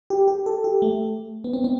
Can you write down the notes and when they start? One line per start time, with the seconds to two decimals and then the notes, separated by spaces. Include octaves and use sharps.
0.10 G4
0.28 G4
0.46 A4
0.64 G4
0.82 A3
1.44 B3
1.53 C4
1.64 C4